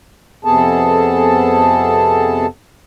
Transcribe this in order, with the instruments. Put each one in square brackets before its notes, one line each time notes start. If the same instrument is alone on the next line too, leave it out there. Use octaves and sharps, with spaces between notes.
[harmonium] F2 C3 B3 G#4 A4 A5